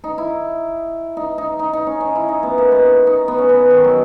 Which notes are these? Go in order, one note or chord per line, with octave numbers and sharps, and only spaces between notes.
D#4
E4
D#4
D#4
D#4
D#4
C#4
C#4
E4
D#4
B3
A#3
B3
D#4
D#4
B3
C#4
B3
D#3
F#3